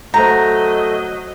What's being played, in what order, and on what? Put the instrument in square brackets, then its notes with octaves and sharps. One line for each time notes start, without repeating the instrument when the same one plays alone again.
[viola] F#3 D#5 [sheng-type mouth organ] A3 [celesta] C5 F#5 G6 [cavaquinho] A#5